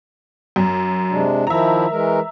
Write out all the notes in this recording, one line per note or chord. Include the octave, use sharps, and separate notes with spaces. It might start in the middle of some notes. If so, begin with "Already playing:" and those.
F#2
C3 G#3 D4
D#3 F3 E4 E5 A#5
E3 G#3 A#4